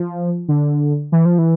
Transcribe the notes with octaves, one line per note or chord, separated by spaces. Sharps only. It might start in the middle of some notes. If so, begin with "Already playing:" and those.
Already playing: F3
D3
E3
F3
E3